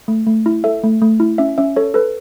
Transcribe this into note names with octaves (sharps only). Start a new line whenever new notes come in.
A3
A3
E4
A4 E5
A3
A3
E4
C#4 E5
C#4 E5
A4 C#5
A4 B4